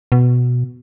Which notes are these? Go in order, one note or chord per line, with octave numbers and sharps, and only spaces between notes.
B2